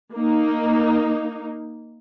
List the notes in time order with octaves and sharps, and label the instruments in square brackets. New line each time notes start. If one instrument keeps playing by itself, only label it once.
[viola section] A#3 D#4